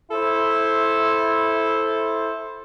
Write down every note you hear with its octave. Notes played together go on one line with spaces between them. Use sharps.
E4 A4 C5